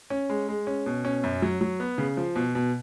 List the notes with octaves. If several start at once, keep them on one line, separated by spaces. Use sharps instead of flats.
C#4
G#3
G#3
C#4
B2
C#4
F#2
F#3
F#3
B3
C#3
F3
B2
B2